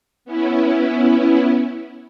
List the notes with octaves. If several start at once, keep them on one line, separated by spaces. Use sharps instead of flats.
B3 C#4 E4